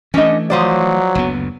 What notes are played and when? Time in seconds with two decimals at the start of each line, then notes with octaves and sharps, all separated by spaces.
0.14 E3 A3 C#4 D4 D#5
0.50 F3 F#3 C5 D5
1.15 F#1 D2 B3